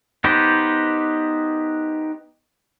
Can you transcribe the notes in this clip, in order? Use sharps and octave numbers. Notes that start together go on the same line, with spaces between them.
B3 D#4 G4 B4 C5